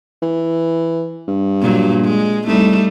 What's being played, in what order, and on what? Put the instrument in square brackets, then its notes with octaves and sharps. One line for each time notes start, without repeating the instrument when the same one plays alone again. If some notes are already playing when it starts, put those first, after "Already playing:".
[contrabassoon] E3
G2
[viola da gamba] A#2 F#3
G#3
[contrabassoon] C2 [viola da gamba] G3 A3 D#4